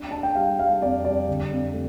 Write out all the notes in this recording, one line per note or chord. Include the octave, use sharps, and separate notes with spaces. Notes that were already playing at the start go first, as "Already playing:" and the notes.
Already playing: D4
D4 A5
G5
G3 F5
G3 F5
F2 D5
G3 D5
D3
F2
A3